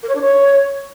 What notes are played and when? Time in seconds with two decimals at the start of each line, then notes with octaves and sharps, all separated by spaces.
0.02 A#4
0.09 C#5
0.15 D4
0.21 C#5